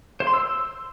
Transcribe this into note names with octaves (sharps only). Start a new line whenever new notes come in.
C5
C6
E6